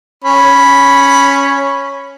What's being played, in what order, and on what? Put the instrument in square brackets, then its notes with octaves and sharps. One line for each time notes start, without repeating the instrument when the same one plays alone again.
[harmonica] C#4 B5